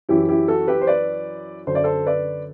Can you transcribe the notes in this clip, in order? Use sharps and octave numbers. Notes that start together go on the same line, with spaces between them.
F#2 E3 E4 G4
E4 G4
F#4 A4
G4 B4
C5
B4 D5
F#2 D3 C5
D5
A4 C5
B4 D5